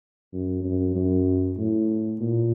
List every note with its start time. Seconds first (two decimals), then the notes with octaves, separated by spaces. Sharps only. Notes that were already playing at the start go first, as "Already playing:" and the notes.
0.33 F#2
0.64 F#2
0.95 F#2
1.58 A2
2.20 A#2